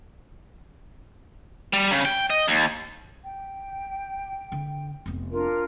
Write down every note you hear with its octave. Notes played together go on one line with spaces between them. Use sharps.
G3
C#3
G5
D#5
D#2
G5
D3
F1 B3
D4 F4 A#4